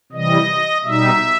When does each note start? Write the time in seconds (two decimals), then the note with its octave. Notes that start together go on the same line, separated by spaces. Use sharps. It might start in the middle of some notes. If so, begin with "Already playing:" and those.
0.12 C3 E3 G3 D#5
0.84 B2 G3 D#4 E5